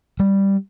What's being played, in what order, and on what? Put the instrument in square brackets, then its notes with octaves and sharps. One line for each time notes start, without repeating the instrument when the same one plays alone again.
[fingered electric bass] G3